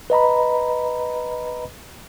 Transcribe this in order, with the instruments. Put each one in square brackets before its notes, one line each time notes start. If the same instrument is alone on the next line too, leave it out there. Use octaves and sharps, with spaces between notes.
[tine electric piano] B4 D#5 A#5 B5